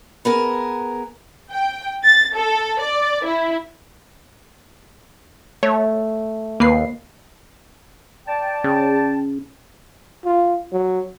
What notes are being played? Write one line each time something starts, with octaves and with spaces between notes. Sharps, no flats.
B3 G#4 A#4
G5
A6
A4
D5
E4
A3 C#5
D#2 A#3 B4 C7
D5 G5 A5
C#3
F4
F#3